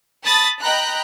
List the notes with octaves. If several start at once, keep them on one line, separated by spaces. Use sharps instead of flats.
A5 B5 D#6 A6
D#5 G5 A#5 B5 F#6